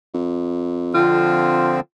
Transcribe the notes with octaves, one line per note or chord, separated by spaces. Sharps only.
F2
D3 F3 C4 F4